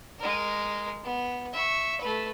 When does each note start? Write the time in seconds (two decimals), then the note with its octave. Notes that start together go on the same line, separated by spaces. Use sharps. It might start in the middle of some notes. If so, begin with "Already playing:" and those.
0.19 G#3 A#4
1.04 B3
1.53 E5 C#6
2.01 A3 B4